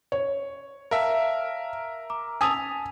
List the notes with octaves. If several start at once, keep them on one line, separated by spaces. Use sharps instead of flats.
C#5
A#4 E5 F5 A5 A#5
A#5 D6
G#5 A5 D#6 E6 B6 F7